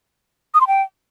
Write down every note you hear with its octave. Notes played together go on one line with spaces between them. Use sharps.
D#6
C6
G5